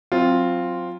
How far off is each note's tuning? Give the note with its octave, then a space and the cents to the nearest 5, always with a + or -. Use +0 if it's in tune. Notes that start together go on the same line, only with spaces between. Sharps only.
F#3 -20 C4 +0 F4 +0